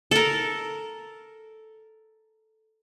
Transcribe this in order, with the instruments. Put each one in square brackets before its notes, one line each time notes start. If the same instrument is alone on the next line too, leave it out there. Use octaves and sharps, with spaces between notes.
[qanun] A4 A#4